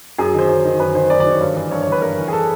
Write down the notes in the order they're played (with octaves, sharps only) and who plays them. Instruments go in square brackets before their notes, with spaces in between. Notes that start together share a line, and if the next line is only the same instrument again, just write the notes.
[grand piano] F#2 G#4
D#3
C5
F#2
D#3
F#2 B4
D#3 C5
F#2 D5
D5
D#3 C#5
G2
E3
G2 C#5
C#5
E3
B4
G2 A#4
E3
G#4
A4